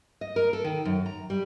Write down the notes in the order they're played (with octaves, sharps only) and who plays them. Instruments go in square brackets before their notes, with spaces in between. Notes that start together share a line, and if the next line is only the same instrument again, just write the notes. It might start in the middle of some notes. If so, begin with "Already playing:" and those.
[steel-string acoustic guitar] D#5
A#4
A4
D#3
F#2
A#5
G3